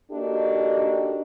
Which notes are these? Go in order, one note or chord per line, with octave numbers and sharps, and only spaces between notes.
A#3 D4 D#4 F#4 G4 A4